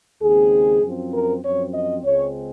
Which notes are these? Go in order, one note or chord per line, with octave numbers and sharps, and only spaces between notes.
D#2 C#3 G#3 C4 G#4
F#2 F3 C4
A#4
F#2 F3 C4 C#5
D#5
C#2 C#3 G#3 C4 C#5